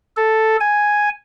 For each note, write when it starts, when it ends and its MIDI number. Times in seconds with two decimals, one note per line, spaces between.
0.17 0.57 69
0.60 1.09 80